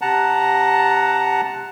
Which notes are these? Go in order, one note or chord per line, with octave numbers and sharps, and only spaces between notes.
C3 F#5 A5 A#5